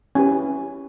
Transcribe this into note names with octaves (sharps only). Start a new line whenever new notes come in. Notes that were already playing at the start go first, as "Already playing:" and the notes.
C#4 E4 G4 B4 G#5